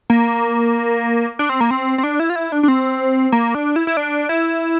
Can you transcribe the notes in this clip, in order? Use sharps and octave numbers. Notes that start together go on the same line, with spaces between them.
A#3
D4
C4
A#3
C4
C4
D4
E4
F4
E4
D4
D4
C4
A#3
D4
E4
E4
D4
E4